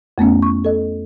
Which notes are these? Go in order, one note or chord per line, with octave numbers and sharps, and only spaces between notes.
F2 A3 B3 C#4
C#6
A4 D#5